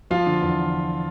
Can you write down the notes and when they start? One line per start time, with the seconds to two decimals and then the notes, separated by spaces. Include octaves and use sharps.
0.10 F3 F4 F5
0.27 D3
0.42 E2